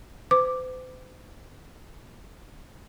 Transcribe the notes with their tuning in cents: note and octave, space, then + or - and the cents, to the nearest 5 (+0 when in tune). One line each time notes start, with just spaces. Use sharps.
C5 -45 D6 +0